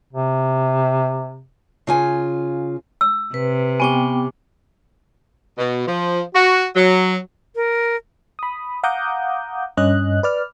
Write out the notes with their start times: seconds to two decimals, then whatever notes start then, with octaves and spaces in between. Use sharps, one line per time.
0.13 C3
1.87 C#3 F4 G#5
3.01 E6
3.34 C3 B4
3.80 B3 G4 G5 G#5 D6
5.58 B2
5.88 F3
6.34 F#4
6.75 F#3
7.56 A#4
8.39 B5 D#6
8.83 F5 F#5 A#5 D6 D#6 G6
9.77 G2 C#4 D#5 F#6
10.23 B4 D5 F6